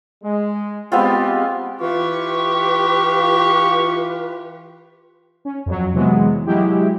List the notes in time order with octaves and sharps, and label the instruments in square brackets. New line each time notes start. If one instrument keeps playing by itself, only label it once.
[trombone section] G#3
[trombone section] G#3 G4 [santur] B3 C4 F4
[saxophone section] E3 F4 [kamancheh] G4 [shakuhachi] B4 [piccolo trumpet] C#6
[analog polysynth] C#4
F2 F#3
C3 E3 F#3 G#3 B3
F#3 G#3 E4 G4